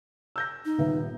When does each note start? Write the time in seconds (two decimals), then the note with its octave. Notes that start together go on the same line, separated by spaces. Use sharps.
0.36 E6 G6 A#6
0.65 D#4
0.78 D#1 B3 E5